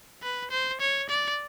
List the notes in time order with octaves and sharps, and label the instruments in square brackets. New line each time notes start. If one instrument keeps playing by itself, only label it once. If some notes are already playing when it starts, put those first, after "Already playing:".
[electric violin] B4
C5
C#5
D5